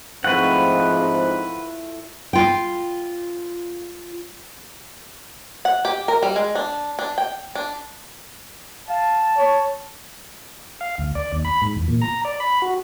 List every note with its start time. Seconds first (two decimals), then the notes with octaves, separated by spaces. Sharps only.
0.24 G#2 F3 A3 C4 E4 F4 B4 F#5
2.33 F4 G5
5.65 F#5
5.85 G4
6.08 A#4
6.23 G3
6.36 G#3
6.55 D4
6.99 D4
7.18 G5
7.55 D4
8.89 F5 A5
9.37 C#5
10.81 F5
10.98 D2
11.15 D5
11.33 D#2
11.45 B5
11.62 G#2
11.76 E2
11.88 A#2
12.02 A#5
12.25 D5
12.40 B5
12.62 F#4